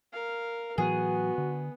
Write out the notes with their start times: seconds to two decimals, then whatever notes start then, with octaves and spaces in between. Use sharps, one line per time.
0.13 A#4 F5
0.78 A2 E3 F#3 B3 F#4 G#4
1.38 D3